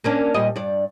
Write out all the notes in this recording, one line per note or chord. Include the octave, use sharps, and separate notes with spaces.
A#3 C#4 D4
A#2 G3 D#5
G2 D5